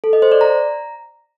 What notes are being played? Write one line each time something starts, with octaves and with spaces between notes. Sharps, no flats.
A4
D#5
C5
D5
A#5